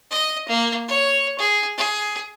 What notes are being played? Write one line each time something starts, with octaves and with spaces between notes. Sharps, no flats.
D#5
A#3
C#5
G#4
G#4